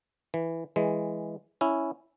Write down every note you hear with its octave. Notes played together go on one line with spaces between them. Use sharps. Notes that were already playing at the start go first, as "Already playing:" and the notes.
E3
E3 G#3
C#4 E4